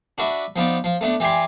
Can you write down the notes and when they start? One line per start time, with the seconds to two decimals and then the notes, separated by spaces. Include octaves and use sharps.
0.18 D4 F#4 B4 E5
0.56 F3 B3 D#4 D5
0.84 F3
1.01 A3 B3 D4
1.20 E3 G4 D5 G#5 C6